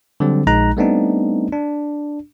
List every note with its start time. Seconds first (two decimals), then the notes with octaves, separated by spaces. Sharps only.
0.20 D3 F#3 G3 C4
0.47 A#1 G#3 D#4 A#5 F#6
0.77 G3 A3 B3 C4 D4 D#4
1.52 D4